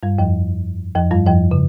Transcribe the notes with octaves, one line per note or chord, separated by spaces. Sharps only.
G2 G3
F2 F3
F2 F3
G2 G3
F2 F3
C#3